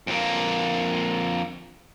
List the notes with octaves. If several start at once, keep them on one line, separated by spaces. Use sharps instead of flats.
F2 A#3